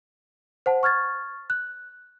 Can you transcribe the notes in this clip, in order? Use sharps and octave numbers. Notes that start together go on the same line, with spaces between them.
C5 F#5 A5
C#6 F6 G#6 A6
F#6